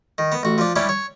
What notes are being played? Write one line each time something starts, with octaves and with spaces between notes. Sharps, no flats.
D#3
B3
A1 F#4
F3 D4
G3 C#4 D4 E4
C#5